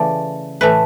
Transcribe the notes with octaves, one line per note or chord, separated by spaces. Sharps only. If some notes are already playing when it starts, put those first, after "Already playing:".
Already playing: C#3 E3 A3 D5
A2 E3 A3 B4